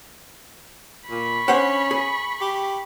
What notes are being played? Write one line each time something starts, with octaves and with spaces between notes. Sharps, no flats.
A#2 B5 C#6
C#4 D4 C5 F#5
G#4
G4